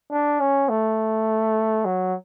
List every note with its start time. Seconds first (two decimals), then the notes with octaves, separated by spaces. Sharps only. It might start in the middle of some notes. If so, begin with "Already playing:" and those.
0.12 D4
0.40 C#4
0.69 A3
1.85 F#3